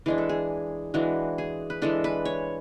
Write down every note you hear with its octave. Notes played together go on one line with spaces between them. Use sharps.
E3 G#3 D4 G#4
A4
G#4
E3 G#3 D4 F#4
G#4
B4
E3 G#3 D4 A4
B4
C#5